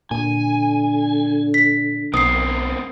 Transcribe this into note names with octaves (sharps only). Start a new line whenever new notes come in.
A#2 D3 G#5
B6
B1 B3 C4 A#4 D#6 C7